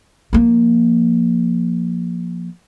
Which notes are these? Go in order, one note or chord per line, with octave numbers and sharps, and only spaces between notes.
F3 A#3